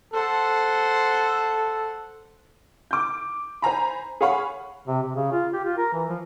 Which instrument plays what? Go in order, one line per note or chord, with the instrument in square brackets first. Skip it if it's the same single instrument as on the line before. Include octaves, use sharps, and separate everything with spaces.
[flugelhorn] A4 [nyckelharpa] C5 F#5
[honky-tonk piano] D6 G6
C5 G#5 A#5 B5
G#4 C#5 F5 F#5 B5 C#6
[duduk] C3
C3
C#3
F4
G4
F4
A#4
E3
F3